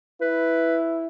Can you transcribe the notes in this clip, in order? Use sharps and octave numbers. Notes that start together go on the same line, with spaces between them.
E4 B4